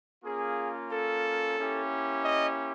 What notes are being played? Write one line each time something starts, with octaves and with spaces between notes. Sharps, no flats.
A#3 C#4 F4 G#4
A4
A#3 C#4 E4 G4
D#5